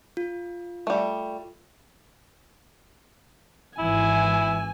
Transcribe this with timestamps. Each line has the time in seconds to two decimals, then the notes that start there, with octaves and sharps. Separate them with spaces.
0.17 F4
0.87 G3 A3
3.79 G#1 E3 E4 G#5